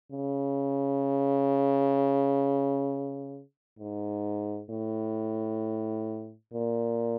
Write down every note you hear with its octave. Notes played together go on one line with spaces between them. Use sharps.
C#3
G#2
A2
A#2